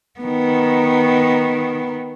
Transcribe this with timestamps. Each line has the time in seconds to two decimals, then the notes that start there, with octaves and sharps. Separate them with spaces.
0.20 D#3 B3